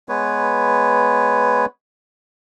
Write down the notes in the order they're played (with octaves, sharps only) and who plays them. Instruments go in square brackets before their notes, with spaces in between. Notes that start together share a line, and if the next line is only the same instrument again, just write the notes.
[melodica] G#3 B3 B4 C#5